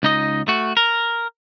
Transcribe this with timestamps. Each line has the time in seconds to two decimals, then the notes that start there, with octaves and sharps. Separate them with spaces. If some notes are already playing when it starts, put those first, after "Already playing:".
0.03 C#2 D#4 D#5
0.48 A3 F#4
0.77 A#4